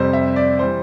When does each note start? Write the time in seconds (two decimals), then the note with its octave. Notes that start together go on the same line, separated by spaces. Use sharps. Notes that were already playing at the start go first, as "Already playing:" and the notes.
Already playing: F2 C3 G3 C5
0.13 E5
0.36 D5
0.59 E3 G3 C5